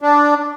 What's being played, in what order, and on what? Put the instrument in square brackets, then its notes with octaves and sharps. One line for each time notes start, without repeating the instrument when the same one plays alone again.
[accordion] D4